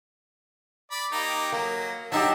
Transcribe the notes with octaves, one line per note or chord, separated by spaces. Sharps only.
D5 B5
A#3 D#4 G4
F#3 A#3
F#3 D#4 G4 D#5 E5 A5